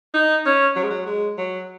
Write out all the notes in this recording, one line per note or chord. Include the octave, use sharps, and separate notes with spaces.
D#4
C#4
F#3
G#3
F#3
G#3
F#3